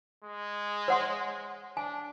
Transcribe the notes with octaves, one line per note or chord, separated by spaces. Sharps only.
G#3
C#5 F#5 C6
D4 G#5